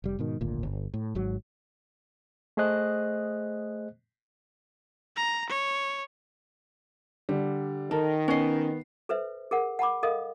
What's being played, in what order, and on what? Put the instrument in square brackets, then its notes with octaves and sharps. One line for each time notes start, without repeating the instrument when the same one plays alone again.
[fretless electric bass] F1 G3
G#2 B2 D#3
D1 G#1 D2 A#2
G1
A2
G#1 G#2 F#3
[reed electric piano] A3 G#4 C5 D#5 F#6
[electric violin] A#5
C#5
[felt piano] D3 G3
[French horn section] D#3 [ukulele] A4 [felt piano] A#4
[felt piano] B3 C7 [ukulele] C#4 D#5
[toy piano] A4 B4 C5 E5
G#4 A#4 F#5
F#5 A5 B5 D6
A4 A#4 D#5 F5 D#6